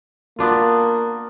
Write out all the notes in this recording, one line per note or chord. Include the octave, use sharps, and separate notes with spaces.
A#3 B3 D4 F4